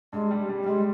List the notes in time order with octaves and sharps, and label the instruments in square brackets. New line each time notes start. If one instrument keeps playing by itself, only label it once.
[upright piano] G2 [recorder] G#3
[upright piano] G3
G3
[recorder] A#3
[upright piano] G3 [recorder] G#3